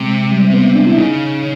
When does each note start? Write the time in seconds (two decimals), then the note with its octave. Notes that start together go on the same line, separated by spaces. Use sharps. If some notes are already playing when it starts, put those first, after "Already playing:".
Already playing: C3 G#3
0.32 G3
0.44 C4
0.54 B3
0.75 D4
0.87 E4
0.97 C#3 D#4